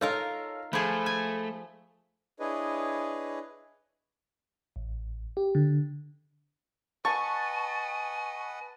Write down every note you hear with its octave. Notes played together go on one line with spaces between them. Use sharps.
D#4 F4 A4 A#4 C#5 F5
F3 A3 G#4 B5
G#5
D4 E4 G#4 B4 C#5 D#5
A1
G4
D3
B4 D#5 F#5 G#5 A5 C#6